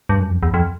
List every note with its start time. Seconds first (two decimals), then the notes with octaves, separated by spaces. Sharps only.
0.09 G2
0.20 F#2
0.31 F2
0.43 E2
0.54 F2